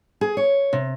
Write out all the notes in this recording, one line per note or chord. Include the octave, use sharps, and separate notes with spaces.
G#4
C#5
C3